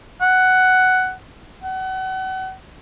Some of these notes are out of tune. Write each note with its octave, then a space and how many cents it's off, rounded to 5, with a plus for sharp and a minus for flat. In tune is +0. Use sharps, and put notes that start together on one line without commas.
F#5 +10
F#5 +35